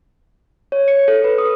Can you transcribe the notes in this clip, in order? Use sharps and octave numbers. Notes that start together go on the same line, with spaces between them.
C#5
C#7
A4
B4
D#6